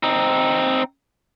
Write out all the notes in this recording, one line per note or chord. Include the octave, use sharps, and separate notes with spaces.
C4 D#4